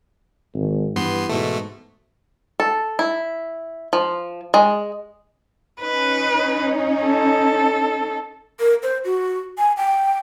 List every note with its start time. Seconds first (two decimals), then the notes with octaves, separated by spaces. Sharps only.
0.54 G#1
0.96 G2 E3 B3 C6
1.29 G#2 B2 A3
2.60 A4
2.99 E4
3.93 F3
4.54 G#3
5.81 C#4 D#4 B4
7.05 A4
8.60 A#4
8.83 C5
9.05 F#4
9.58 G#5
9.77 G5